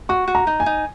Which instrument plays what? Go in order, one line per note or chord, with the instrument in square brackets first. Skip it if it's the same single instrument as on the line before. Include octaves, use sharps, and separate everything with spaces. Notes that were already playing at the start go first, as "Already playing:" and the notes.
[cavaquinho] F#4 [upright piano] C#6
[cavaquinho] F#4
[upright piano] A#5
[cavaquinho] D#4
[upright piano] G#5
[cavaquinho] D#4